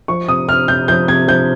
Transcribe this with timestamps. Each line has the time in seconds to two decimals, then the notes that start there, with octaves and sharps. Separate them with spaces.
0.08 F3 C#6
0.28 C3 D#6
0.48 C3 F6
0.68 C3 G6
0.88 F3 G6
1.08 C3 G#6
1.28 F3 G6